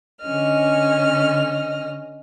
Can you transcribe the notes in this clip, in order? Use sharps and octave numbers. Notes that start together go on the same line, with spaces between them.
D3 C#4 D#5 F6